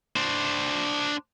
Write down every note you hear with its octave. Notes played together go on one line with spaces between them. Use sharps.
D4 C5